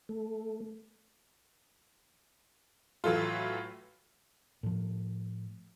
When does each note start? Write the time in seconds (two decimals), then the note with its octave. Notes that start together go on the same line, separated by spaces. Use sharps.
0.09 A3
3.04 A2 E3 F#3 A3 F4
4.63 A2 F3